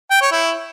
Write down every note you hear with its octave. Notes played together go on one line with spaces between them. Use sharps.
G5
C#5
E4